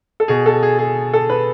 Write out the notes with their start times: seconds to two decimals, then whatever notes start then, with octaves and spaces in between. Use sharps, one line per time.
0.20 A4
0.28 B2 G#4
0.46 A4
0.63 G#4
0.79 G#4
1.14 A4
1.30 B4